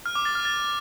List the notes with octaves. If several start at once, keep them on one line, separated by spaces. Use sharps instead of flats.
F6
D6
A6
F6
A6